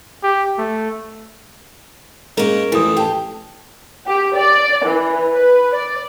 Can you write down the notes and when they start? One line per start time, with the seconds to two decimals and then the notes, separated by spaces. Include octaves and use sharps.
0.23 G4
0.58 A3
2.37 G#2 A#3 C#4 A#4
2.72 A1 F2 E3 E4 D#6
2.97 G4 G5 A5
4.06 G4
4.36 D5
4.86 E3
5.32 B4
5.74 D5